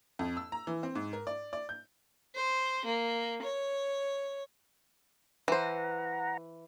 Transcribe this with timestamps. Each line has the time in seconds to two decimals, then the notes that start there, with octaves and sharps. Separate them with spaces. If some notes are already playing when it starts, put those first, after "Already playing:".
0.19 F2
0.37 E6
0.52 A#5
0.67 E3
0.83 C4
0.95 G#2
1.13 A#4
1.27 D5
1.53 D5
1.69 G6
2.35 C5
2.85 A#3
3.42 C#5
5.48 E3 C5 F#5 A#5